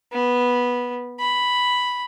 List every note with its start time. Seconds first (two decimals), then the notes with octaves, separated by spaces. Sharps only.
0.12 B3
1.20 B5